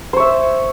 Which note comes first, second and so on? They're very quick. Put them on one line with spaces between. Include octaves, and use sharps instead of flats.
C5 C#5 E5